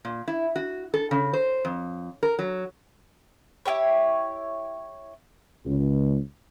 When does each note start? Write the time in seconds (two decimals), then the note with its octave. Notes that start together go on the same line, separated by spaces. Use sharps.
0.05 A#2
0.28 E4
0.56 F#4
0.94 A4
1.11 C#3
1.33 C5
1.65 F2
2.23 A#4
2.39 F#3
3.66 E4 F4 G4 C#5
5.66 C#2